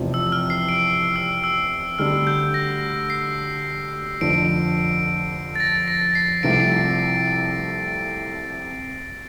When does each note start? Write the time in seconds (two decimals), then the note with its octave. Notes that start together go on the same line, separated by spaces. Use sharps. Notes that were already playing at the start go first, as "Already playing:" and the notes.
Already playing: F1 E2 C3 F3 C4
0.14 E6
0.32 F6
0.50 C7
0.69 D7
1.16 E6
1.44 E6
1.99 D2 D3 G3 D4 F6
2.27 G6
2.54 A#6
3.10 C7
4.20 F1 F2 D3 F3 D7
5.56 A6
5.60 A#6
5.88 A#6
6.15 C7
6.43 C2 C3 F3 A3 D7
6.62 C7